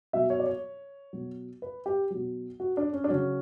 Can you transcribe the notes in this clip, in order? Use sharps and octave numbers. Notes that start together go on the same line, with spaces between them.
B2 F#3 E5
C#5
D5
C#5
B2 F#3
B4
G4
B2 F#3
F#4
D4
C#4
D4
C#3 F#3 C#4